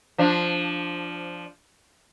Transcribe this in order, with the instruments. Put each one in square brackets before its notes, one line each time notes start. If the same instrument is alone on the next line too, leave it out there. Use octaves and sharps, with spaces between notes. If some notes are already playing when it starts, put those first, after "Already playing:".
[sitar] F3 D4